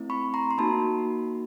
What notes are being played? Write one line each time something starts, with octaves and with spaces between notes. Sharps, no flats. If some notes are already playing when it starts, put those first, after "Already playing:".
Already playing: A3 C4 E4
B5 C#6
A#5 C6
C6
A#3 D#4 F#4 A5 B5